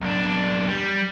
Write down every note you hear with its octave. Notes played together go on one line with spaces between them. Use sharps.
B1 D4
G3